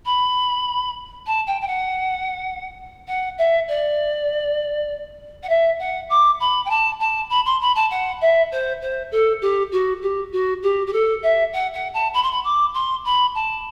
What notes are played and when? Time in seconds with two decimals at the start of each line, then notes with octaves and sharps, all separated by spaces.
0.06 B5
1.27 A5
1.47 G5
1.61 G5
1.67 F#5
3.08 F#5
3.38 E5
3.68 D5
5.43 F#5
5.49 E5
5.79 F#5
6.09 D6
6.40 B5
6.65 G5
6.70 A5
7.00 A5
7.30 B5
7.46 C6
7.61 B5
7.75 A5
7.91 F#5
8.21 E5
8.52 C5
8.82 C5
9.12 A4
9.42 G4
9.72 F#4
10.02 G4
10.32 F#4
10.63 G4
10.87 G4
10.93 A4
11.23 E5
11.53 F#5
11.74 F#5
11.94 A5
12.14 B5
12.23 C6
12.31 B5
12.44 D6
12.74 C6
13.05 B5
13.35 A5